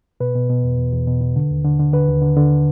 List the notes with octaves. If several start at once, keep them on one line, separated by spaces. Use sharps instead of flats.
B2 B4
B2
B2
E2
E2
E2
B2
B2
D3
D#2
D3
D3
D3 B4
D#2
D3
D3